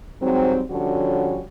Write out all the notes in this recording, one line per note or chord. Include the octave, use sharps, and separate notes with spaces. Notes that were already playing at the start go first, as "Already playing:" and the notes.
G#2 F#3 G3 C4
D3 F3 G3 C#4 F#4 C#5